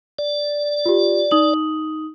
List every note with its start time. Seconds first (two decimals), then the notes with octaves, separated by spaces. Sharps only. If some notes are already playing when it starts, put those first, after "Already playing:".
0.19 D5
0.86 F4 G4
1.31 D#4 D#6 F#7